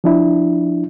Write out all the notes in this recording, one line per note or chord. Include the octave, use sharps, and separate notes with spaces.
F3 D4 E4